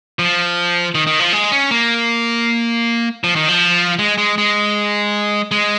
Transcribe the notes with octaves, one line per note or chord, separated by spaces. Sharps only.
F3
D#3
D#3
F3
G#3
C#4
A#3
F3
D#3
F3
G#3
G#3
G#3
G#3